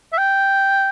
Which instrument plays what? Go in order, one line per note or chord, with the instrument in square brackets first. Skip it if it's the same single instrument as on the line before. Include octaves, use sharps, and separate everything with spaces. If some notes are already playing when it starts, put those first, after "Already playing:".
[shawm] E5
G5